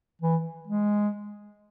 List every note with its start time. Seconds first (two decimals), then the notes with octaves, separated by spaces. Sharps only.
0.22 E3
0.68 G#3